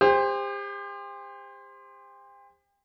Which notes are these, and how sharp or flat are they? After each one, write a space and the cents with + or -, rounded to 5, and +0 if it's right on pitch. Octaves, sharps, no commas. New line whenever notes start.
G4 +40 C5 +0